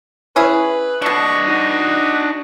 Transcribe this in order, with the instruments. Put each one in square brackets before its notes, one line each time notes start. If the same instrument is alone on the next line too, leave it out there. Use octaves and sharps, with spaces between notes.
[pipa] C#4 E4 G#4 [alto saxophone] B4
[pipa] B2 A3 [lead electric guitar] D4 D#5 [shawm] C#6
[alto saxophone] D#4 [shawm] F#4